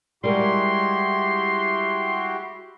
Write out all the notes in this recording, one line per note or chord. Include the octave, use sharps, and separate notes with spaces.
G3 G#3 E4 F#4 G4 A#4 C6